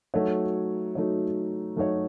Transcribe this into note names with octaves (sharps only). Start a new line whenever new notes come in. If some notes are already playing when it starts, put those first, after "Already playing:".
F#3 A3 D#4 F#4 C#5
F#3 A3 D#4 F#4 C#5
F#3 A3 D#4 F#4 C#5